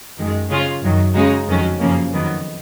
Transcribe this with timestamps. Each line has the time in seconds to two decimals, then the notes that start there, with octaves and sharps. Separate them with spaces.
0.17 F#2 D#3 G#3
0.49 C#3 G#3 C#4 F4
0.81 F#2 D#3 F#3
1.14 C#3 G#3 D#4 F#4
1.47 F2 D#3 F#3 C#4 F#4
1.79 F#2 C#3 F3 A#3 C#4
2.13 F2 D#3 F#3 B3